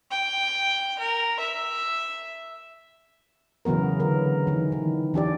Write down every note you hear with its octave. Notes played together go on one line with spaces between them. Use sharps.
G5
A#4
E5
C#3 E3 F#3 B3 A#4
D3 A#4
D#3 E3
D#3
E3 D4 G4 D5